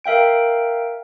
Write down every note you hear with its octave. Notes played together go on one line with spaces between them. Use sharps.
A#4 E5 F5 G5 D7